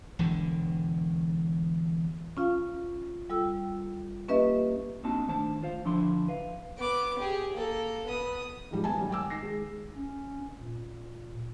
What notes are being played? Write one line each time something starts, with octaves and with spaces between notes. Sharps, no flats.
E1 E2 D3
C#4 F4 F5
G3 F4 A4 G5 E6
A#3 C#4 G4 B4 D#5 E5
A#3 C4 D4 D#4 F#4 A5
D#3 A3 D4 C5 A5
F4 C5 F5
D3 F3 D4 E4 E5 C6
B4 F5
B3 D6
G4 G#4
A#3 A4
B3 D#6
G#2 D#3 F3 G3
B3 G#5 A5
D#3 F#3 G3
G5 G#5 D6 E6
D#3 A#6 C7
G#3
C#4
A#2